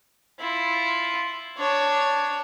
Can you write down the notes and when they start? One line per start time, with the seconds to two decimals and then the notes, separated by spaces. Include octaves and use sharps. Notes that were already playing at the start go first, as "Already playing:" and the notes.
0.39 E4 F4
1.57 D4 C#5